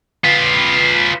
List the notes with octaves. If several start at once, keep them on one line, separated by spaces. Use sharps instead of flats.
F4 B4